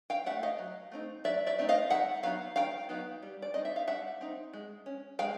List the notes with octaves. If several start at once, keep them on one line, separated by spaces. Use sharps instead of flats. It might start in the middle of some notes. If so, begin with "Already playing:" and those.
F5 G5
A3 C#4 E5 F#5
D#5 F5
F#3
A3 C4 D#4
F#3 D5 E5
D5 E5
A3 C4 D#4
D#5 F5
D#3 E5 F#5
F#3 B3 D#4 F5
D#3 F5 G5
F#3 B3 D#4
G3
D5
C4 D#4 D#5
E5
F5
G3 E5 F#5
C4 D#4
G#3
C#4
G#3 F5 G5